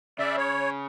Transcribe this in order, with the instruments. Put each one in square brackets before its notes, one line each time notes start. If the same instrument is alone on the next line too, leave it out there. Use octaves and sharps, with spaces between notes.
[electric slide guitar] C#3 [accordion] D5 E5
[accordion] C#5